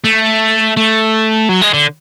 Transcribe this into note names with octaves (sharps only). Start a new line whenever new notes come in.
A3
A3
F#3
G#3
D3